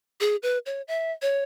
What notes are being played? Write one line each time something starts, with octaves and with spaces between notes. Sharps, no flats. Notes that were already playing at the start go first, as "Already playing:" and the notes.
G#4
B4
C#5
E5
C#5